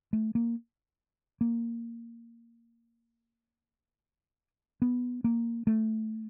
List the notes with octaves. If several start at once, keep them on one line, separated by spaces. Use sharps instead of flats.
A3
A#3
A#3
B3
A#3
A3